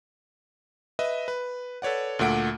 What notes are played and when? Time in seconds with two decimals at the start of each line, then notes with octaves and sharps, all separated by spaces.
0.99 B4 D#5 E5
1.28 B4
1.82 A4 B4 C#5 D5 F#5
2.19 D2 A#2 A3 F#5 D7